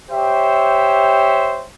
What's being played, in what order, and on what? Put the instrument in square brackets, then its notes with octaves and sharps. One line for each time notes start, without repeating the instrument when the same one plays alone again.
[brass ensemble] G4 C5 C#5 E5